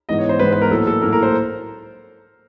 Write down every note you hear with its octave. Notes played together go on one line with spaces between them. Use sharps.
G#2 E3 G#3 B3 D#5
C#5
C5
G#2 E3 G#3 B3 B4
B4
A#4
A2 F#3 A#3 A4
A4
A2 F#3 A#3 A#4
A#4
C5